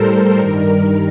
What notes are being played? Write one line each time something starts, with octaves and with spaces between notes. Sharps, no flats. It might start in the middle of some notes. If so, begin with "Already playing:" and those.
Already playing: A2 G3 A4 A#4 C5
G2 D#3 G3 A#4